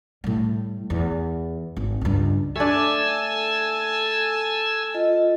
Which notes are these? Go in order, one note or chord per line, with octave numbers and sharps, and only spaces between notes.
A2 G3
E2
G#1
C#2 G2
A3 D4 A4 G#5 A5 E6
F4 D#5